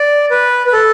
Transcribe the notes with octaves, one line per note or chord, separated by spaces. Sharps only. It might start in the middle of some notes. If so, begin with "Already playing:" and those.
Already playing: D5
B4
B4
A4